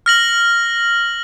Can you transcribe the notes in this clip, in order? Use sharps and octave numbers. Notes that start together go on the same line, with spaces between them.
F6 A#6 F#7